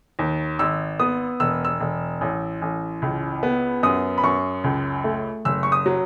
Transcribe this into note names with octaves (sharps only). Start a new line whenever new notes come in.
D#2
G#1 E6
B3 D#6
E1 E6
E6
E1
A1
A1
C#2
B3
F#2 D#6
B5
F#2 C#6
C#2
A3
F#1 E6
C#6
D#6
F#3